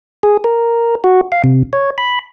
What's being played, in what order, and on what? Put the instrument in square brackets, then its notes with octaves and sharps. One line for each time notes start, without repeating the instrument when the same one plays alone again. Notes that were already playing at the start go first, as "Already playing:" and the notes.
[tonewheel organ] G#4
A#4
F#4
F5
C3
C#5
B5